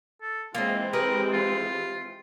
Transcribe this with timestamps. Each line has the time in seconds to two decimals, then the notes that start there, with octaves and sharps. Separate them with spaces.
0.22 A4
0.55 E3 G#3 A#3 C4 F4 D#5
0.93 G4 G#4 A#4 B4
1.33 F4